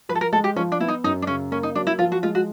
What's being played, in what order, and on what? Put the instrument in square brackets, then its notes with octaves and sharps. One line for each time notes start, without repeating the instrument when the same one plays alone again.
[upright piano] F3 [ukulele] B4
[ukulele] A4
A#4
[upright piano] G#3 [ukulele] A4
[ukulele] G4
[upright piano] F3 [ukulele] C#4
[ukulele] D4
[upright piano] B3 [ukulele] E4
[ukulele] D#4
[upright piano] F#2 [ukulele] D#4
[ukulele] D4
[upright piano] C#3 [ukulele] C#4
[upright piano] A#3 [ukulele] C#4
[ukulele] D#4
[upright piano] F#3 [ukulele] D4
[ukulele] E4
[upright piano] F3 [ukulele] F4
[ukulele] F#4
[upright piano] G#3 [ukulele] F4
[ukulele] F#4